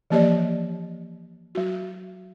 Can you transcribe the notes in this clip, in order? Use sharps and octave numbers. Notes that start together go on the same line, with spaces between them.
E3 F3 A#3 G4 C#5 D5
F#3 F#4